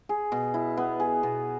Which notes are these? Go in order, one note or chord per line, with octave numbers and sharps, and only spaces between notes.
G#4
B2
E4
B3
G#4
B2